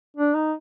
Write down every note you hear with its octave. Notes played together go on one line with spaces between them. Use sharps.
D4
D#4